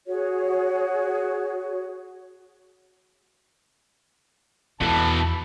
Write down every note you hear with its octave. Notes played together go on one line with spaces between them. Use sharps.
F#4 G#4 C#5
E2 B2 E3 F4 A4 A5 B5